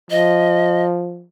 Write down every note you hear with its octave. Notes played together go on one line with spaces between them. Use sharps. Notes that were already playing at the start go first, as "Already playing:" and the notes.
F3 D#5